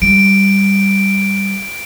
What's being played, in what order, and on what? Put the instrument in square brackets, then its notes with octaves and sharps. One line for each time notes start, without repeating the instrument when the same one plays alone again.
[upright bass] G3 [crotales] D7